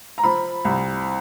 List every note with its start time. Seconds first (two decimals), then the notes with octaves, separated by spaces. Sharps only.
0.18 A#5
0.23 F3 B5
0.65 C2